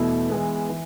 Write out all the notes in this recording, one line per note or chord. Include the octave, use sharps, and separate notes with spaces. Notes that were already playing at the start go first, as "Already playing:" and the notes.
Already playing: E2 B2 A3 E4
E3 G#3 B3
E3